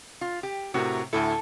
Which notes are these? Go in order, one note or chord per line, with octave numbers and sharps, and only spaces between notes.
F4
G4
A2 C3 F#4 A#4
D2 A2 E4 A4